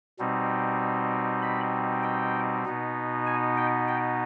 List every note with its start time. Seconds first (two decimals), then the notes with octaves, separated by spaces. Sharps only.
0.19 B2 G3 C4 D#4
1.42 B5
2.03 G5
2.65 B2 B3 D#4
3.27 G#5
3.58 G5
3.88 G5